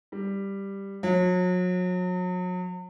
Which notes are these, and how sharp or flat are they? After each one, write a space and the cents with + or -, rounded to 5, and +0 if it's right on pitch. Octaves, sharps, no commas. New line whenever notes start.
G3 +5
F#3 -35